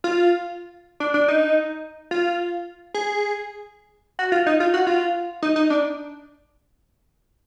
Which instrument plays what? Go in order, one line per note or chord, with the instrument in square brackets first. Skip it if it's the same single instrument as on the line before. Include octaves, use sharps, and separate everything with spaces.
[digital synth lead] F4
D4
D4
D#4
F4
G#4
F#4
F4
D#4
F4
F#4
F4
D#4
D#4
D4